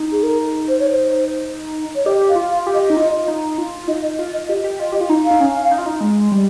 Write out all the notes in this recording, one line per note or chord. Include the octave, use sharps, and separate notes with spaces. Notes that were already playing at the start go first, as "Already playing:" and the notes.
Already playing: D#4
G#4
A#4
C5
C#5
C5
C#5
G4 D#5
F5
F4
F5
G4
D#5
D#4
F4
D#4
F4
D#4 D#5
F4
D#5
G4
G4
F4 D#5
G4
F4
D#4
F5
D#4
C#4
D#4
F4
D#4
G#3
G3